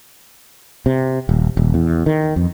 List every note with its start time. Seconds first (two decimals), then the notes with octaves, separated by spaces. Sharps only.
0.86 C3
1.29 D#1
1.57 D#1
1.74 E2
2.06 D#3
2.36 F2